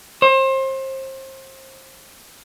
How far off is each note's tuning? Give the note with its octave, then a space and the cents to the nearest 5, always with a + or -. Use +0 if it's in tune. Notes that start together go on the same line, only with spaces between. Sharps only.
C5 +30